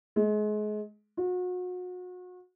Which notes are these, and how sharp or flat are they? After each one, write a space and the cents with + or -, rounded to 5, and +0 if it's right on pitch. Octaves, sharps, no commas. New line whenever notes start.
G#3 +30
F#4 -35